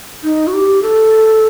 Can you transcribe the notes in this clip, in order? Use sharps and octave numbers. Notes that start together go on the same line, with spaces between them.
D#4
F#4
G4
A4